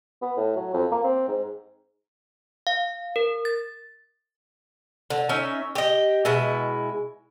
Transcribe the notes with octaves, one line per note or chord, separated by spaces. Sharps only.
B3
A2
F#3
F2
A#3
C4
G#2
F5
A#4
A6
D3
C#4 D#4 E5
G4 D#5
B2 G#3 E4